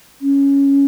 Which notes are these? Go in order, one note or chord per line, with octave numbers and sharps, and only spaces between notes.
C#4